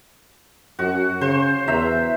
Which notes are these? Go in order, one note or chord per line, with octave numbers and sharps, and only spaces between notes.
F#2 F#4
C#3 C5
E2 E5 A#5